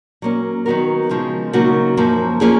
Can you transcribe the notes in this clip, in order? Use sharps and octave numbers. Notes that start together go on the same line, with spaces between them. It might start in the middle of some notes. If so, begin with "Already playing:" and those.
F#3 A#3 C#4
D#3 F#3 B3 F#4 A#4
C#3 F3 G#3 D#4
C#3 F#3 A#3 D#4 F#4
F#2 F3 A#3 C#4
F3 A#3 C#4 F4 G#4